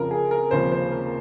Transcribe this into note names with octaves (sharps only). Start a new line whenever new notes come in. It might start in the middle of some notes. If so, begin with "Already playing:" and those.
Already playing: F2 C#3 F3 A#4
G#4
A#4
F1 D#2 C#3 F3 C5
C5
A#4